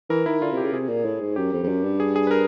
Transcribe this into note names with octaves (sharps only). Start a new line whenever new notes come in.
E3 A#4
D#3 E4
D3 F4
C3
G4
C#3
C3 G#4
A#2
A2
G#2
F#2 G4
F2
F2
F#2
G2
G#4
G#4
B4
A#4